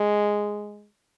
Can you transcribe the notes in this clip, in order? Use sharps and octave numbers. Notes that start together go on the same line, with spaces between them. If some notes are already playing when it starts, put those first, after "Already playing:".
Already playing: G#3